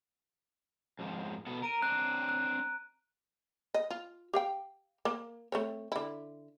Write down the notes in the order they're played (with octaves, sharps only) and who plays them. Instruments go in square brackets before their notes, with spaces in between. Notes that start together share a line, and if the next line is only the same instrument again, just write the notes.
[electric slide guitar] F2 G#2 F3
B2 B3 A4
[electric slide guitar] A#4 [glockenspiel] A#5 D7 D#7
[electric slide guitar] C4 D4 [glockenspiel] F#6
[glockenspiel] F#6
[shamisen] D#5
F4
G4 F5 G5
A#3
A3 C4 C#5
D3 E4